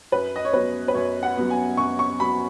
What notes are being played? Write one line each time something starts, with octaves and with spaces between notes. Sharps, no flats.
F#2 B4
D#5
C#5
F#3 B3 B4
B4
F#2 C#5
F#5
F#3 B3
G#5
F#2 C#6
C#6
F#3 B3 B5